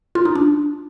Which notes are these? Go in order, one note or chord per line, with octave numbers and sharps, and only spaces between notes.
F4
D#4
D4